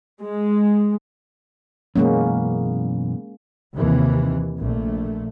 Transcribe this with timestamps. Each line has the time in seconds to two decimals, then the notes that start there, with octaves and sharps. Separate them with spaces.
0.23 G#3
1.96 F#2 B2 E3 G#3 A#3 C#4
3.74 D#2 C3 E3
4.60 A#1 A3